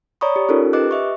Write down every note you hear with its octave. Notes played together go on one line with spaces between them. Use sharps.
C#5 D5 A#5 B5 C#6 D#6
G4
C#4 D#4 F4 G4 A4 A#4
G4 B4 D#5 D6 F#6
D#5 E5 C#6